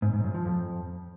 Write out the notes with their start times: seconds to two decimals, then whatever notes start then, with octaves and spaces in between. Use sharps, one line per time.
0.02 G#2
0.13 G#2
0.24 F#2
0.34 F3
0.45 F2